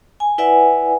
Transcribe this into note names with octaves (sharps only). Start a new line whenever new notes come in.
G#5
E4 B4 D5 E5 F#5 G#5